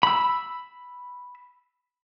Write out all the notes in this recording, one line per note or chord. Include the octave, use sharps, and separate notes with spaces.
B5 E6